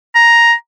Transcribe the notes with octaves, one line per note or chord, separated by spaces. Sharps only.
A#5